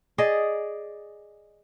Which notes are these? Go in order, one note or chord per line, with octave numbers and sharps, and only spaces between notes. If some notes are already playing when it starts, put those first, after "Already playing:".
G#4 D5 D#5